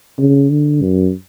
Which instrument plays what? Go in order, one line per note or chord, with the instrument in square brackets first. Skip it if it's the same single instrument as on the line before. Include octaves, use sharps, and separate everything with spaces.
[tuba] C#3
D3
F#2